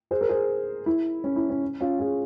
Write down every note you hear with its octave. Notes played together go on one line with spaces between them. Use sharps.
G#4 C5
A#4
G#4 C5
E4
C#4
E4
C#4
C#4 F4
F4 G#4